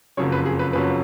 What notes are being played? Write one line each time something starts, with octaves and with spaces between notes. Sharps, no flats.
F#1 F2 C#3 F#3 C#5
B4
G#4
B4
F#1 F2 C#3 F#3 B4